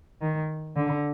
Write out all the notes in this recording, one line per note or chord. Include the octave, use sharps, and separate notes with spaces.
D#3
D3